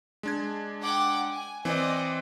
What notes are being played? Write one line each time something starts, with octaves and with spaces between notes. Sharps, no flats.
G#3 D4 G#6
F#5 G5 D6
G#5
E3 C4 D5 D#5